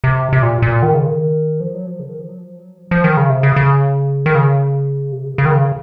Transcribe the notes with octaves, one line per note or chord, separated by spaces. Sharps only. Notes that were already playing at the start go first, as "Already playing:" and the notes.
C3
C3
A#2
A#2
D#3
C#3
D#3
F3
F#3
F3
C#3
D#3
F3
F#3
F3
F#3
F3
F3
D#3
C#3
C3
C#3
C#3
D#3
C#3
C3
C#3
C#3
D#3
C#3